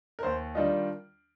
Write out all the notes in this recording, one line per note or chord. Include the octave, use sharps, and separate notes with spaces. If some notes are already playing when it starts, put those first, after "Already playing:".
A#4
D#2 C5
D#3 G3 D4 F4 D#5